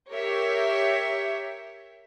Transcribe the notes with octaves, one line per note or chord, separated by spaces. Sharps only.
G4 A#4 C#5 E5